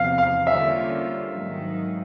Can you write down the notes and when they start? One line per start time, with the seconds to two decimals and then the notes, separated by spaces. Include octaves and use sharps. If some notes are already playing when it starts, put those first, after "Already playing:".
Already playing: E2 C3 F3 F5
0.18 F5
0.47 D3 G3 A#3 C#4 F4 E5
1.33 G#2 D#3 F#3